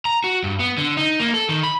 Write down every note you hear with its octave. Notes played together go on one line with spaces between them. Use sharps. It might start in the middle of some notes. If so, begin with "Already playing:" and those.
A#5
F#4
G2
B3
D3
D#4
A#3
A4
D#3
B5